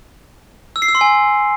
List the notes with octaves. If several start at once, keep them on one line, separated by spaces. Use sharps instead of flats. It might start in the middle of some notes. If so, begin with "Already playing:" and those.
E6
C7
E6
C6
G#5